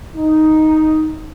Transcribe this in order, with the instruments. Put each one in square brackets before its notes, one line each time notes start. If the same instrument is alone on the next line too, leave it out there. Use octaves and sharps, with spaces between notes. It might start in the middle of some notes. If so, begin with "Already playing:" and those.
[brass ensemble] D#4